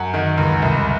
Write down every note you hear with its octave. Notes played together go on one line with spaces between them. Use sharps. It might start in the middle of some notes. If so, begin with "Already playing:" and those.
Already playing: F#2 F#5
D#3
C#2
C2